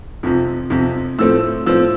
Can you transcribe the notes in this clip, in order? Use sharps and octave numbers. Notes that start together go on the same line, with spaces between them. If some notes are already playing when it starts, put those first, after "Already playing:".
F2 C3 F3
F2 C3 F3
A2 F3 A3 C4 E6
A2 F3 A3 C4 E6